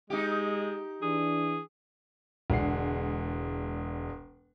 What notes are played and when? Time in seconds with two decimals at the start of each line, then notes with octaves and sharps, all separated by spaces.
0.10 G#3 D#4 G4
1.02 E3 D4 G#4
2.50 E1 D3 G#3 D4 F#5 C7